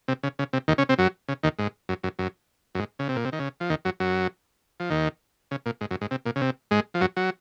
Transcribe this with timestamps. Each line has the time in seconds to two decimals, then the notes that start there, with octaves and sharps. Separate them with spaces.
0.08 C3
0.23 C#3
0.39 C#3
0.53 C3
0.68 D#2 D#3
0.78 C#3 C#4
0.89 C3 C4
0.98 F#2 F#3
1.28 C#3
1.43 D#2 D#3
1.59 G#2
1.89 F#2
2.03 F#2
2.19 F#2
2.75 F#2
2.79 G#2
2.99 C#3
3.09 C3
3.16 A#2
3.25 C3
3.32 D#3
3.40 C#3
3.60 F3
3.70 D#2 D#3
3.85 F#2 F#3
4.00 F#2 F#3
4.80 F3
4.90 D#2 D#3
5.51 C#3
5.66 A#2
5.81 G#2
5.91 F#2
6.01 G#2
6.11 C3
6.26 A#2
6.36 C#3
6.41 C3
6.71 G#2 G#3
6.94 F3
7.01 F#2 F#3
7.17 F#3